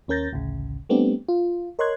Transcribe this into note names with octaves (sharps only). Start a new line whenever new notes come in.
D#2 C#4 A#4 G6 A6 A#6
A1 D2 C#3
G3 A3 B3 C4 D4 G4
F4
A#4 C#5 D#5 C6 F#6 G#6